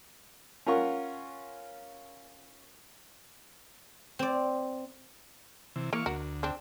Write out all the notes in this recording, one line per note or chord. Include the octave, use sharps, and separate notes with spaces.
C#4 F4 A#4 F#5 C#6
C4 D5
C3 E3
E3 A#3 F5 C#6
D2 F#4 A#4
C4 D4